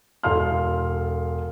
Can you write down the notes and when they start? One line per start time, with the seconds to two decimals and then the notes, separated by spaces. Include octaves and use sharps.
0.23 E1 A4 F5 C6 F6